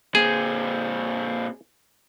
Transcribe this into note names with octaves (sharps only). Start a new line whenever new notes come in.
A#2 C4 G#4